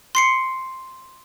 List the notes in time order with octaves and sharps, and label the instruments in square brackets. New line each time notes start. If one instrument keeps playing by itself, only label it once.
[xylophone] C6 C7 C#7